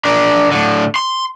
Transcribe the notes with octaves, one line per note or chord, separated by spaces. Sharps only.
D4 A#4
A2 D3
C6